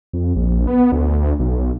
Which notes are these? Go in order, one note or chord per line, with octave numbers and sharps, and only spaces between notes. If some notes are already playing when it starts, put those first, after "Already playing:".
F2
A#1
B3
D2
B1